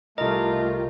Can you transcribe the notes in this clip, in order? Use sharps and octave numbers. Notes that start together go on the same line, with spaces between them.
C2 A3 F4 G4 A#4 D#5 A#5